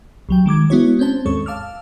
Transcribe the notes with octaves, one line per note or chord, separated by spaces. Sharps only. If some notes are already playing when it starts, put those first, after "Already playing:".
C2 F#3 G5
D#3 G#3 D6 G#6
G#3 B3 E4 F#4 C#5
C4 C#4 C5 A5
D#2 G#2 G#3 A4 C#5 C#6
F5 A5 D6 E6 F6